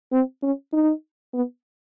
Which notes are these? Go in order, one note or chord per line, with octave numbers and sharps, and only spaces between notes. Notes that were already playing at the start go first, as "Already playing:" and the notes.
C4
C#4
D#4
B3